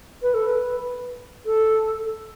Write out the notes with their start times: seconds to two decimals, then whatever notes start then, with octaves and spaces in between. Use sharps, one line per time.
0.22 B4
0.34 A4
0.46 B4
1.46 A4